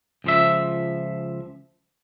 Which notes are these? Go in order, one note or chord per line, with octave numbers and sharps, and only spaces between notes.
C#2 F3 E5